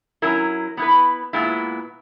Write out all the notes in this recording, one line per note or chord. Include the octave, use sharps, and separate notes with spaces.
F#3 C#4 E4 A#4
B3 E4 B4
A#2 G#3 B3 E4